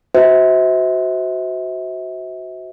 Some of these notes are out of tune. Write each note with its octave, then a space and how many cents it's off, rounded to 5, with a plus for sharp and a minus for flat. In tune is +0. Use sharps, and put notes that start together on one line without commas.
F#4 +0 C5 -25 E5 -35